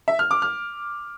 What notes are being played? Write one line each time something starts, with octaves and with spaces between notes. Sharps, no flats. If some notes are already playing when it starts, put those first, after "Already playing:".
E5
F6
D6
F6